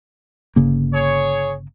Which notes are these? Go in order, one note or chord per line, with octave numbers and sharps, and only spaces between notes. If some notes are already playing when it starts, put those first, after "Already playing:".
G1 C#3 A#3
G#4 C#5